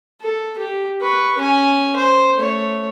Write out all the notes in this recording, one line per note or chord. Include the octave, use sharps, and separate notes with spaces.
A4
G4
B4 C#6
C#4 G#5
C5
A3 C#5